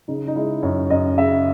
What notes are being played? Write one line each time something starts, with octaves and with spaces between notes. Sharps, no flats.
C#3 D#4
D#4
G#3 E4
F#2 C#5
F#2 D#5
C#3 E5